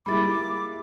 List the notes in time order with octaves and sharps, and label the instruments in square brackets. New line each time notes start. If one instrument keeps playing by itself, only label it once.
[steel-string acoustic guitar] G3 A#3 [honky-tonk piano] G#3 E4 [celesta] B5 A6 [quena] D6